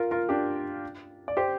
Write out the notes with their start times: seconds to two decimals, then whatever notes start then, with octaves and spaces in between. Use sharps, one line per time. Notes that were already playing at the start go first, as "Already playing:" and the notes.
Already playing: F4 A#4
0.11 F4 A#4
0.29 D4 G4
1.28 D5
1.37 G4 C5